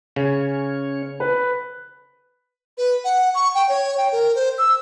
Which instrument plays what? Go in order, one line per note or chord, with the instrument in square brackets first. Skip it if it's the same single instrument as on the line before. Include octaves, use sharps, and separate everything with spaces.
[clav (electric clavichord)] C#3 [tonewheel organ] C#4 C#5
[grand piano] B4
[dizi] B4
F#5
C#6
G5
C#5
G5
A#4
C5
E6